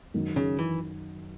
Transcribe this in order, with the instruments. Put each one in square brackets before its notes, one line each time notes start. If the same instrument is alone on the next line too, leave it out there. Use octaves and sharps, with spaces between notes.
[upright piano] F#2 D#3 F#3
[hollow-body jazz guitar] C#3
E3